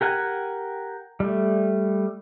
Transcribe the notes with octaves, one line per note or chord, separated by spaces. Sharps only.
G4 A#4 F#5 G#5
G3 A3